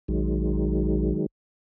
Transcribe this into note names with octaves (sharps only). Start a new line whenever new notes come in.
A#1 D#3 F#3 G#3